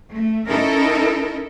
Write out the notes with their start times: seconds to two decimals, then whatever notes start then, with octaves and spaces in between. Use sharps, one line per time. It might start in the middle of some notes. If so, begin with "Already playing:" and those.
0.12 A3
0.48 C#4 D#4 E4 A4 A#4